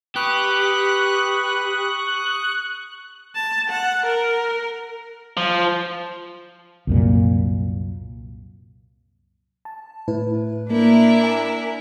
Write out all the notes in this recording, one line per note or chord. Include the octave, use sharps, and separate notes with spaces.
G4 B4 C#6 D#6 F#6
A5
F#5
A#4
F3
C2 F#2 A#2
A5
A2 E4 B4
A#3 D4 E4 A#4
G#5